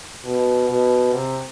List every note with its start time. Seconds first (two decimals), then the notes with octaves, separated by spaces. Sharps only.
0.24 B2
0.69 B2
1.13 C3